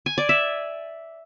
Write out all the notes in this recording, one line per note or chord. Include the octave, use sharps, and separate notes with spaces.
G#5
D5
E5